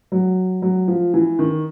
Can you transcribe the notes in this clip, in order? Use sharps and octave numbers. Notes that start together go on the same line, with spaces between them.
F#3
F#3
F3
E3
D#3